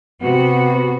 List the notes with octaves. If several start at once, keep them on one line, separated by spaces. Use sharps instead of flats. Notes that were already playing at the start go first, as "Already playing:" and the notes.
C3 B3 F#4